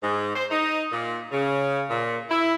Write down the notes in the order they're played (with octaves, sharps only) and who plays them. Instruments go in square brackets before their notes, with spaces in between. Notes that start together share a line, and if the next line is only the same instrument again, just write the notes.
[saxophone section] G#2
C5
D#4
A#2
C#3
A#2
E4